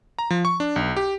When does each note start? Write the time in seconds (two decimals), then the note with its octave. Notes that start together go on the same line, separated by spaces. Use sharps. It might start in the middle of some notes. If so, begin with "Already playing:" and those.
0.19 A#5
0.30 F3
0.45 C#6
0.60 D4
0.76 B1
0.97 G4